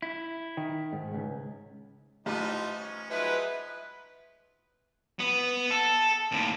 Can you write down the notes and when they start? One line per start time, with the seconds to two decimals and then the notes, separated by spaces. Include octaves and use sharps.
0.02 E4
0.57 D#3
0.93 G#2
1.14 C#2
2.26 A1 F3 G3 D#4
2.79 C#4
3.10 F3 F#3 G#3 D#4 B4 E5
5.19 B3
5.71 A4
6.32 D#2 A2